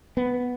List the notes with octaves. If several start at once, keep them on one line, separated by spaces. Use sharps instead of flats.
B3